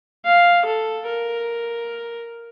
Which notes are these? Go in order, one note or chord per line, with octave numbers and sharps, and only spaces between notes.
F5
A4
A#4